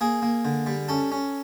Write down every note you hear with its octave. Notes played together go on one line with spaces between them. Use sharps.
A#3 G#4
A#3
D3
G3
C#4 A4
C#4